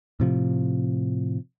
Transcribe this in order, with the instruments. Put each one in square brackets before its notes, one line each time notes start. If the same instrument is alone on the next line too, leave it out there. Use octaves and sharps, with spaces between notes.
[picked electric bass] A2 C3 F3